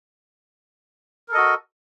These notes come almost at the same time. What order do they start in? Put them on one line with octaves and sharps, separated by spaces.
A#4 A4 D#5 F#4